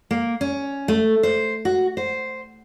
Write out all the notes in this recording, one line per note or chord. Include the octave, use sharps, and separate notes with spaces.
A#3
C#4
A3
C5
F#4
C5